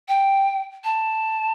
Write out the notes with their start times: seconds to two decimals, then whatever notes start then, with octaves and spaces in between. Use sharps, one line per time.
0.08 G5
0.84 A5